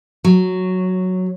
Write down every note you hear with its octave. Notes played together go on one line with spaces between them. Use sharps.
F#3